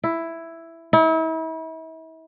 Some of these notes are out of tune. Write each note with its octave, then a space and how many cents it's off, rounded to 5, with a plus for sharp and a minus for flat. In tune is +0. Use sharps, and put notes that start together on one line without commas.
E4 +5
E4 -40